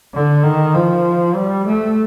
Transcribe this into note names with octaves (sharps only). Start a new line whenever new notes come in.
D3
D#3
F3
G3
A3